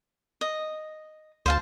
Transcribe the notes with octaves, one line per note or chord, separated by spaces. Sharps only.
D#5
D2 C5 F5 A5